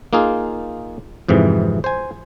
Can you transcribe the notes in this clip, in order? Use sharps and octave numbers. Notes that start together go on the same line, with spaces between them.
A#3 D#4 F4 G#4
F2 G#2 C3 E3
C5 G#5